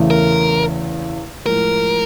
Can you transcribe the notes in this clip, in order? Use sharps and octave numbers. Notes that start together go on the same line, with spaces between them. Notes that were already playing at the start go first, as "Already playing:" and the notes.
Already playing: E2 C#3 E3 A3
A#4
A2 F3 G#3 A#4